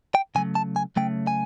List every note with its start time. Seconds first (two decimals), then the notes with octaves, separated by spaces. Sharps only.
0.15 G5
0.35 C#3 F#3 A3 G#5
0.55 A5
0.76 G#5
0.96 C#3 F#3 A3 G5
1.27 G#5